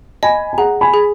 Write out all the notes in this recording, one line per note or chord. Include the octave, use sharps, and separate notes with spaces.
D#5 G#5 B5
G#5
G#4 F#5 A#5
G#5 B5
G#4